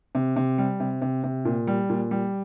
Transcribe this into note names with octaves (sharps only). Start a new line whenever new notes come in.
C3
C3
G3
C3
C3
C3
A#2
G3
A#2
G3